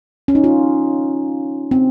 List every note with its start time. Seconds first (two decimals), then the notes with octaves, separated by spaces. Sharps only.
0.28 C#4
0.35 D#4
0.44 F4
1.71 C4